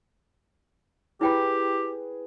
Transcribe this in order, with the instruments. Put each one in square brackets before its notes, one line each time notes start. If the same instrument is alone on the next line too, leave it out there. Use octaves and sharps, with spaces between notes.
[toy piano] E4 G5 B5 [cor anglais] G4 [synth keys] G#4 B4